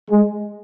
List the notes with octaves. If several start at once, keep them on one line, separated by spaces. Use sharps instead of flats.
G#3